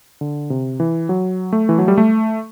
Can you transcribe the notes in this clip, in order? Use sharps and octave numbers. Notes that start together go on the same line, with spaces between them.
D3
C3
E3
F#3
A3
E3
F#3
G3
A3